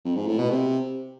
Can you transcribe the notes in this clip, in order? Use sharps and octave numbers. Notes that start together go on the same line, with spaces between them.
F2
G#2
A2
B2
C3